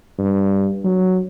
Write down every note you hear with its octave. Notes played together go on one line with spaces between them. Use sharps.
G2
F#3